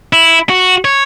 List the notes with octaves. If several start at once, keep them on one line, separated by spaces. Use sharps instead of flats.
E4
F#4
C#5